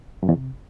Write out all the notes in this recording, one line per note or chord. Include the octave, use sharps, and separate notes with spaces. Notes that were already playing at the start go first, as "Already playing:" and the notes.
F#2
E2
C3